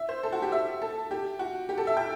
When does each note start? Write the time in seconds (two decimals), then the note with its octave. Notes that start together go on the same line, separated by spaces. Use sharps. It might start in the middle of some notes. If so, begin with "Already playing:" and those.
Already playing: E5
0.09 C5
0.23 A4
0.32 F#4
0.42 G4
0.52 E5
0.82 A4
1.11 G4
1.39 F#4
1.69 G4
1.78 A4
1.87 E5
1.97 G5